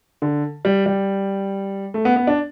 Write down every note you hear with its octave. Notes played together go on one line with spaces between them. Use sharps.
D3
G3
G3
A3
B3
B3
D4